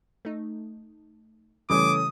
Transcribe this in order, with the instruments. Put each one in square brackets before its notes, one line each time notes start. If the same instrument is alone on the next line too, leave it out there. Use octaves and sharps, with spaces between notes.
[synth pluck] A3 D#4
[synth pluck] C#3 G3 [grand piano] E3 A3 C#4 [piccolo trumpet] D6 [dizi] D#6